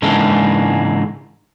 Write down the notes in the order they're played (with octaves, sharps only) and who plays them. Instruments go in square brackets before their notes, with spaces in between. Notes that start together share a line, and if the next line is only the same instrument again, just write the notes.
[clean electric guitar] G#2 C#3 E3 G#3 A#3 D4